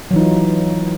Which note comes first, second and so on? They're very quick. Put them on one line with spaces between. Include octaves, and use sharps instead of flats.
F#3 E3 D#4 F4